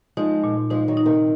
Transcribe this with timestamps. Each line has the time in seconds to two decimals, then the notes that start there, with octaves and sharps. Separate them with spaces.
0.17 F3 G#3 D#4
0.44 A#2
0.70 F3 G#3 D#4
0.88 D#3 F#3
0.97 D#4
1.06 C3 D#3